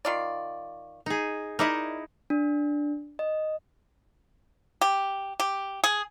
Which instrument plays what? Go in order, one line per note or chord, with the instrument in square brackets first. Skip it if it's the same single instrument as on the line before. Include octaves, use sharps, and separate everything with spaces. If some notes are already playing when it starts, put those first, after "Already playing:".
[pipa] D#3 F4 D5
[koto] D#4 G#4
[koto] D#4 E4 [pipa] A#4 D5 D#5
[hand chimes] D4
D#5
[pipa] G4
G4
G#4